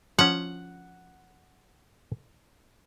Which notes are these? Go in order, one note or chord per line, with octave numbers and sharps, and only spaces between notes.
F3 C#4 F#5